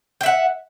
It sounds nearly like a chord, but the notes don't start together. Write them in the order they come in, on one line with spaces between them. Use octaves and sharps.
G5 E5 F#5